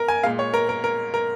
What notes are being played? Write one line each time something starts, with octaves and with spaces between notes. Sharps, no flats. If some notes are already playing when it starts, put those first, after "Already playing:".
Already playing: A#4
G#5
A#2 G#3 F5
C#5
A#4
A#4
A#4
A#4